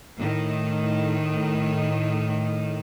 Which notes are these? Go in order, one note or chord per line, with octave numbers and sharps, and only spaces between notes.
A2 D#3